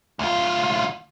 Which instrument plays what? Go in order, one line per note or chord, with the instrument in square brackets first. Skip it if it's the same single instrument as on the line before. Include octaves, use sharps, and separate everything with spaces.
[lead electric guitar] D2 F4